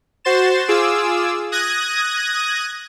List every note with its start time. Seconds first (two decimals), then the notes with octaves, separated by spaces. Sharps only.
0.25 F#4 C5 C6 A6 E7
0.68 F4 G#4 D6 E6
1.52 D#6 F#6 G#6 A#6 D#7